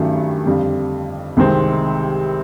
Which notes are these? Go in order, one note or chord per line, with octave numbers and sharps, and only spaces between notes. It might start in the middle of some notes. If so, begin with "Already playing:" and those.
Already playing: G2 D#3 F#3 A3 C#4
F2 D3 G3
C2 C3 D#3 G#3 C4